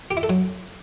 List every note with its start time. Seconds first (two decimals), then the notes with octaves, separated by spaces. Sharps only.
0.11 G4
0.17 E4
0.23 A4
0.29 F#3